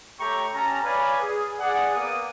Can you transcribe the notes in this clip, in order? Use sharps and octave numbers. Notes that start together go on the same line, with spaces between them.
A3 G4 C#5 G5 A#5 C#6
C#4 G4 A5 A#5
B4 C#5 D5 F5 G#5 B5
G#4
G#4 D5 F#5
A#3 B3 D6 D#6